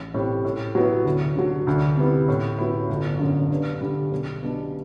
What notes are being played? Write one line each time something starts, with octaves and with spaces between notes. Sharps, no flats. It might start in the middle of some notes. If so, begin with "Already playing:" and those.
Already playing: A1
A2 G3 C4
A2
F#3 B3 E4
D2
D3 F#3
D2
C3 G3 B3 E4
A2
F#3 B3 E4
G1
F#2 D3
G2
D3 G3
B1
B2 G3 D4